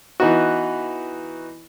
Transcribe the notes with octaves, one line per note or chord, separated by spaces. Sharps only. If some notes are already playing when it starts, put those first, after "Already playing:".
E3 B3 D#4 F#4